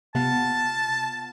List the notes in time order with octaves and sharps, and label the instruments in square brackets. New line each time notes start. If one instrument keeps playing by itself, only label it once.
[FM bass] C3 [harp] B3 F4 [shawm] A5